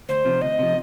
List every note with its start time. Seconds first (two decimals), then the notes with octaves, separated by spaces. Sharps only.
0.09 D2 C5
0.25 C3 F3
0.42 D2 D#5
0.59 C3 F3